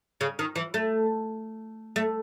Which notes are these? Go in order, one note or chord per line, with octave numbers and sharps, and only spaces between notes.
C#3
D#3
E3
A3
A3